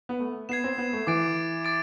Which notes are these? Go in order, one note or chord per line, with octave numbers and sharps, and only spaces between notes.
B3
A3
B3 G#6 C7 E7
C4
B3
A3
E3 D6 A6 D7
D6 A6 D7